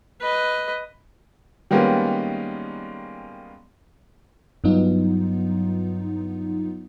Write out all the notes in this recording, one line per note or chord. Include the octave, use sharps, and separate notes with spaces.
B4 D#5
D#3 G3 G#3 A#3 B3 C#4
G2 F#3 B3 D#4 F4